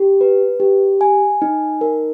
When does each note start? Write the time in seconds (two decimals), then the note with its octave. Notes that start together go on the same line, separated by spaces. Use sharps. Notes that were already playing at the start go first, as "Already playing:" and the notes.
Already playing: G4
0.21 B4
0.60 G4
1.01 G#5
1.42 D#4
1.81 A#4